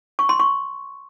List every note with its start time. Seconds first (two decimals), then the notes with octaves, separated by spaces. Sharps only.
0.19 C#6
0.29 C6
0.40 C#6